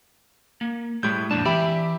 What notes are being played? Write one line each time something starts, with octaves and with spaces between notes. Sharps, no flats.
A#3
A2 G3 G#3 E4 G6
F2 A#2 D4 A5
E3 G4 D5 E5 B5